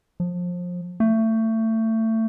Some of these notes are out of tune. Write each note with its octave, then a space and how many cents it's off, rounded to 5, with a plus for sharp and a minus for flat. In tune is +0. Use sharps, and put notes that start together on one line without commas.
F3 +25
A3 +25